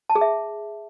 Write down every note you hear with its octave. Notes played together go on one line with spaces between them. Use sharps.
A5
G#4
E5